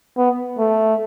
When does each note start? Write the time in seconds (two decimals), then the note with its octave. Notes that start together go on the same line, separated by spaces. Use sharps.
0.17 B3
0.59 A3